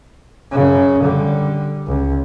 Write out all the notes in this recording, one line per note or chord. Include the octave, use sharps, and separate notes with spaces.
F#2 C#3
D3 G3
C#2